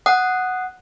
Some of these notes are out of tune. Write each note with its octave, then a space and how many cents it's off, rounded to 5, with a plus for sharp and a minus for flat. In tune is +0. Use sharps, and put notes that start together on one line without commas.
F#5 +0 D#6 +0